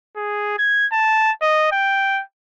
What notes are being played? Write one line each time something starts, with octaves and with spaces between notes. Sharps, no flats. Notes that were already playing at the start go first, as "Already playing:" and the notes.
G#4
G#6
A5
D#5
G5